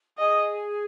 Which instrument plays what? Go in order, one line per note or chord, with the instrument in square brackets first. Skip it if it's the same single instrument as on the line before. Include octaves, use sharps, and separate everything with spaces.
[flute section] G#4 [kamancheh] D#5